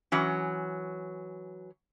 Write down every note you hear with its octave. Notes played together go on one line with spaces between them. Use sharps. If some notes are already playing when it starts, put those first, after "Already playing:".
E3 F#3 C#4